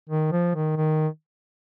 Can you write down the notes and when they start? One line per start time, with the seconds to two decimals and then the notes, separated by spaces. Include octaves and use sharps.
0.10 D#3
0.32 F3
0.55 D#3
0.77 D#3